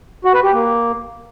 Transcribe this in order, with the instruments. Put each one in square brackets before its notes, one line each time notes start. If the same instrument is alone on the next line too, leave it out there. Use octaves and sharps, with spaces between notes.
[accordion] F#4
B4
G4
A#3